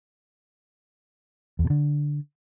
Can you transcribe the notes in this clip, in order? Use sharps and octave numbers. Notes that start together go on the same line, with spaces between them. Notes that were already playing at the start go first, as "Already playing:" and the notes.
E2
B2
D3